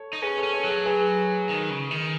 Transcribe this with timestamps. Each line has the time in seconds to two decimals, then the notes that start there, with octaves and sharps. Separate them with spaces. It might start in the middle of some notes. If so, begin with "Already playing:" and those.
Already playing: A4 C#5
0.13 D#4
0.22 C#4 G#4 B4
0.38 A4 C#5
0.43 C#4
0.54 A4 C#5
0.64 F#3
0.69 G#4
0.85 G#4 B4
1.49 D#3
1.70 C#3
1.91 D#3